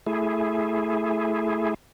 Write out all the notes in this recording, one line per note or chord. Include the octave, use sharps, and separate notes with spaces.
A3 E4 G#4